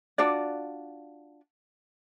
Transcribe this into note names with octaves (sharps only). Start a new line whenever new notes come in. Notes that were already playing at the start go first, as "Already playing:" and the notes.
D4 F4 F#4 D5